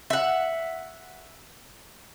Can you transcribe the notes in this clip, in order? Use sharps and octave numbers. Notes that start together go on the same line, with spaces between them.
E5 F#5